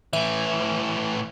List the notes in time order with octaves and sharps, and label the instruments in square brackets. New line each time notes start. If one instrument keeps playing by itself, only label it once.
[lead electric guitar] A2 E3 [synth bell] E5